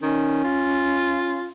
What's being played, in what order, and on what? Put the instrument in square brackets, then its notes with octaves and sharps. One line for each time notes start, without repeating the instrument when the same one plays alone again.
[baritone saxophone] D#3 [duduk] C#4
[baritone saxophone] F4